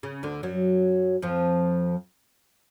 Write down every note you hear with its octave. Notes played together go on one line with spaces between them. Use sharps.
C#3
D2 D3
F#2 F#3
F2 F3